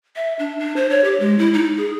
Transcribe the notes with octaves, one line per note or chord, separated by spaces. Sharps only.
E5
D4
D4
C5
C#5
G4
G#3
E4
D#4
G#4